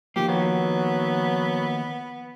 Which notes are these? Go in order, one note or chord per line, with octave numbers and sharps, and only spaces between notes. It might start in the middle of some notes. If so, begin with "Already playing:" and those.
D#3 F3 A#3 G4
F#3 B3